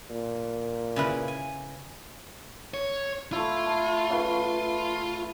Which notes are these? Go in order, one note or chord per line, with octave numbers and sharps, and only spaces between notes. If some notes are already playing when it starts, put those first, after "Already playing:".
A#2
C#3 E4 B4
G#5
C#5
A3 E4 F4
A5
C#3 F#4 B4